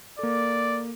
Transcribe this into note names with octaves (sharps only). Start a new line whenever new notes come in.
A#3 A4 D5